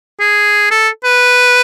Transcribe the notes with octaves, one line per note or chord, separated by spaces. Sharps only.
G#4
A4
B4